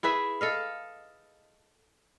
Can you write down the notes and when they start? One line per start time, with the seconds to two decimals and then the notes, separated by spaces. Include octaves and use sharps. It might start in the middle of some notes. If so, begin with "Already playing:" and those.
0.03 E4 G#4 B4 E5
0.41 A4 D#5 F5